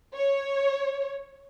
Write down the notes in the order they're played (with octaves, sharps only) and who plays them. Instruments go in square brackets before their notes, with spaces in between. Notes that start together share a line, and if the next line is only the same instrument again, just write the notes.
[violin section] C#5